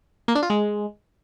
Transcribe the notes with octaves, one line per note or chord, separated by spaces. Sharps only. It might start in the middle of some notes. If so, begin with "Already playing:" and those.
A#3
D4
F4
G#3